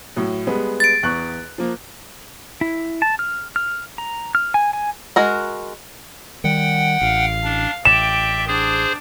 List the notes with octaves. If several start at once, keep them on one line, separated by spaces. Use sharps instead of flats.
A2 F#3
G3 G#3 B3
A6 D7
E2 C#6 F#6
F3 A#3
E4
A5
F6
F6
A#5
F6
G#5
G#5
G#3 F#4 A#4
D#3 G3 F#5 G5
A1 F5
D4
A1 D5 E5 G5 E7
D4 G#4 C5